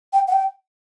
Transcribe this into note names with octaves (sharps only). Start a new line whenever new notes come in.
G5
F#5
G5